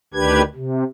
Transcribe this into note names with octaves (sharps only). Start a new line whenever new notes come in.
D2 D#3 D4 G4 B4 G#6
C3